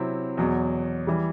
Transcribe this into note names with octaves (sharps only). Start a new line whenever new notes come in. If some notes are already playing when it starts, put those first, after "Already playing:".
Already playing: C3 F#3 C4 E4
E2 B2 F#3
E3 G3